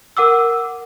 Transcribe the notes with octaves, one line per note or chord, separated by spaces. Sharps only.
A#4 F#5 D6 E6